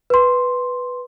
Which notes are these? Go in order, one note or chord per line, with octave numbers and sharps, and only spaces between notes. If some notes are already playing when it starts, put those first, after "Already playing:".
B4 C6